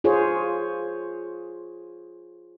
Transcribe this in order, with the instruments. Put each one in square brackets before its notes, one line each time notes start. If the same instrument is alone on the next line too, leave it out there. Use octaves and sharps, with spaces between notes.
[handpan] F4 G#4 C5 C#5